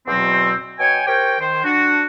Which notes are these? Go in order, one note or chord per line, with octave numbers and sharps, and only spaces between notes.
E2 B2 F#3 C4
B2 C#5 G5 G#5
G4 A#4 C5 C#5 G5
D#3 C5
D4 F#4